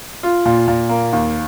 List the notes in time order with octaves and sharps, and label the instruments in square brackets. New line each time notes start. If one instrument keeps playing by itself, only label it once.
[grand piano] F4
A#2
A#2
A#3
D#2